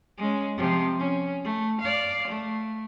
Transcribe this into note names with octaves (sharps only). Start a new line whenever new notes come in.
G#3 C#4
C3 F3
C#4
A3
D5 F5
A3